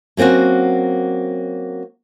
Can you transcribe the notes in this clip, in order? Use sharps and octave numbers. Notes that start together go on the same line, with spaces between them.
F#3 A#3 C4 C#4 F#4